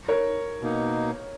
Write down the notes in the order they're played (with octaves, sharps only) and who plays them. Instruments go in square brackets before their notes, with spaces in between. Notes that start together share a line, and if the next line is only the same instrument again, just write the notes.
[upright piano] A#4 C#5
[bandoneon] B2 A#3 D#4